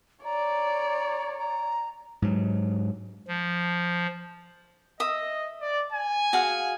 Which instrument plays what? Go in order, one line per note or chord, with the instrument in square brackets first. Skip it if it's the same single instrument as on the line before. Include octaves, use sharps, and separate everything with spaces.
[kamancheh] C#5 D5 [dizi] A#5
[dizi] A#5
[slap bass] G#2 F#3
[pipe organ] F3
[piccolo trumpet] D#5 [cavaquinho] E5 D#6
[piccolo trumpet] D5
G#5
[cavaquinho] F#4 G#4 F5